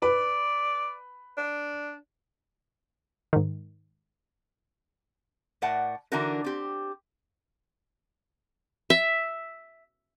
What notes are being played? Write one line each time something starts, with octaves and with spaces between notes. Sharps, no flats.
B4 D5
D4
G#2 D#3
A2 A#4 D5 F#5 A5
D3 E3 D4 D#4 F#4 A#4
C4 G4
E5